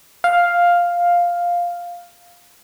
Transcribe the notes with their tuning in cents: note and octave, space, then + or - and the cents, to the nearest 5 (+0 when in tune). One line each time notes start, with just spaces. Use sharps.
F5 +5